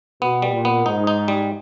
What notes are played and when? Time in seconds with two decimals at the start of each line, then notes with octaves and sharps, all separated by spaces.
0.22 B2 B3
0.42 G3
0.53 A#2
0.65 B3
0.86 G#2 D#4
1.07 D#4
1.28 G3